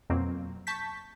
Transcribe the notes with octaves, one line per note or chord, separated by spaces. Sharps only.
F2 B2 F#3 A#3 C4
A5 C#6 G6 B6